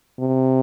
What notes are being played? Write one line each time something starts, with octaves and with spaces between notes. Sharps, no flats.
C3